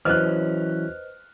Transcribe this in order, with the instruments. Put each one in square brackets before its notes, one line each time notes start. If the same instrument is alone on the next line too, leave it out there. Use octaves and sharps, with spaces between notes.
[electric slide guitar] E3 F#3 C#4 [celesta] B4 C5 D#5 [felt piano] F6 F#6